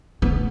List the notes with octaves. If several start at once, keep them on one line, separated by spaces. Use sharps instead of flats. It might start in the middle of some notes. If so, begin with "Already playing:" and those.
B3